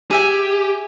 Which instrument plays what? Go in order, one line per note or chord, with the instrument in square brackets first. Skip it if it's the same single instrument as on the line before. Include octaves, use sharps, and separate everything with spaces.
[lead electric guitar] G4 [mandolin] G#4 E5 G#5